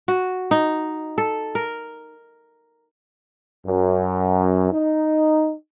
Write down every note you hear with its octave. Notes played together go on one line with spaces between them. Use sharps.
F#4
D#4
A4
A#4
F#2
D#4